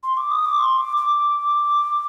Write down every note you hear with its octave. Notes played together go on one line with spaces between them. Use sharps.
C6
D6
D#6
D6
C6
D6
D6